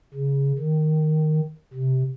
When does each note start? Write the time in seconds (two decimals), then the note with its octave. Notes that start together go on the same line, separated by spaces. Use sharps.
0.14 C#3
0.59 D#3
1.74 C3